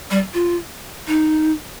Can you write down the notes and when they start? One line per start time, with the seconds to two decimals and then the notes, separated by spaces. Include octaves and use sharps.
0.11 G3
0.34 F4
1.08 D#4